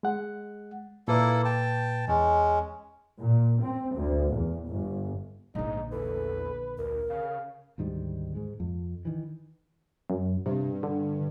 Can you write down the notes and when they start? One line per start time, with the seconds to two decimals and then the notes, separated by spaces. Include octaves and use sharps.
0.03 G#3 F#5
1.08 A#2 A#3 E4 A4 B4
1.45 G5 A5
2.08 E2 G#3 C#4
3.21 A#2
3.63 C4
3.95 D2
4.32 E2
4.68 G1
5.55 A#1 G#2 D3 D#4
5.92 E2 A4 B4
6.78 D2 A#4
7.10 C#3 F5
7.78 D2 G#2 D#3 G3
8.35 G#2 G#3
8.60 F2
9.05 D#3 E3
10.10 F#2
10.46 G2 C3
10.83 D3